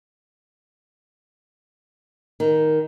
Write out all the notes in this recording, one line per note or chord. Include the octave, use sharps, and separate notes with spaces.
D#3